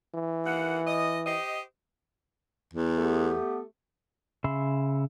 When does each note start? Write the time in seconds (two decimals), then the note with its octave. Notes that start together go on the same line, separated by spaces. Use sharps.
0.15 E3
0.45 D#2 A#3 F#5
0.86 D#5
1.25 G4 C5 D#5
2.73 E2
2.98 A3 B3 G4
4.44 C#3 E5 B5 C6